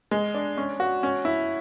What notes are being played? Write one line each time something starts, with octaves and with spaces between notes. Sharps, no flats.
G#3
D4
C#4
F#4
C#4
E4